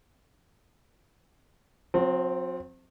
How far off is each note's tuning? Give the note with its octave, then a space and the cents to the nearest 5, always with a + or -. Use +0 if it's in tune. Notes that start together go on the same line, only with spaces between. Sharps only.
F#3 -45 C4 +0